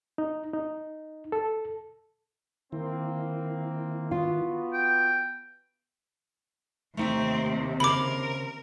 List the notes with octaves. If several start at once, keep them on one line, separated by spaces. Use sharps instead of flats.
D#4
D#4
A4
D#3 A#3 C4 E4
B3 F4 F#4
G5
D#2 C3 A3 C4 D#4 E5
C#3 A#4 C5 B5 D6